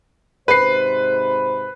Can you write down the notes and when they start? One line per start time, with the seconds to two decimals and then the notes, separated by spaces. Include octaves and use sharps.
0.48 G#2 C3 B4 C5 C7